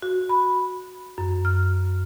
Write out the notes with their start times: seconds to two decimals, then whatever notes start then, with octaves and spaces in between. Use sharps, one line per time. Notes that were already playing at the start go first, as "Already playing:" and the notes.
0.02 F#4
0.29 B5
1.18 F#2
1.45 F6